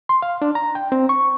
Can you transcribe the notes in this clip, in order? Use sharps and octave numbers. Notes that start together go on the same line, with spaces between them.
C6
F5
D4
A#5
G5
C4
C#6